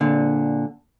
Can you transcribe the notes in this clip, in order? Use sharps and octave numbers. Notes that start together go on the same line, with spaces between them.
A#2 D3